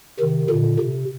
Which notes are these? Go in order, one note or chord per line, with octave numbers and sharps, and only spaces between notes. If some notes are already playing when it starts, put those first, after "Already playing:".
C3 D#3
A#2 D3
C3